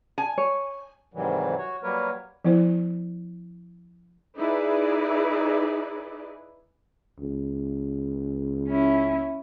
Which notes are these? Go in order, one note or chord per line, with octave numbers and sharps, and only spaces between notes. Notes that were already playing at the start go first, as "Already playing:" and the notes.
G#5
C#5
G#2 C3 D#3 E3 F#3 G3
F#4 C#5
F#3 G3 A#3 A#4 B4 C#5
F3 B3 E4 C5
D#4 E4 G#4 B4 D5
C#2
C#4 E4